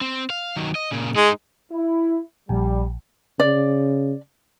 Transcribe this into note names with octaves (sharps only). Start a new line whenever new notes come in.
C4
F5
D#3 F#3
D#5
A#2 C#3
G#3 D#4 G#4
E4
A#1 G3
C#3 D5